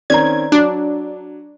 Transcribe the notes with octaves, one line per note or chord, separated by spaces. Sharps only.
D#3 C4 C#4 D5 A#5 G#6
F#3 D4